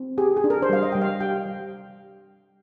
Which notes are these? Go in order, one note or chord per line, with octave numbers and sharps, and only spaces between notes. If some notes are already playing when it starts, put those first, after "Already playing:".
Already playing: C4
G4 G#4
G#4
D4
A#4
C5
G3 F5
D#5
G3 G5
F5
G4 G5
G3